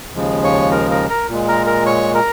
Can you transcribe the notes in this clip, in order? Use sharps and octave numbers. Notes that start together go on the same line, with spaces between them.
D#2 C#3 F3 G#3
C#5 C#6
A#4 A#5
A#4 A#5
A#4 A#5
A#2 G#3
A#4 A#5
A#4 A#5
C#5 C#6
A#4 A#5